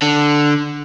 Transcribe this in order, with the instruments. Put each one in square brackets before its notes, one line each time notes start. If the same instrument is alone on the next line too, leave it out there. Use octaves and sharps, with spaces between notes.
[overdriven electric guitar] D3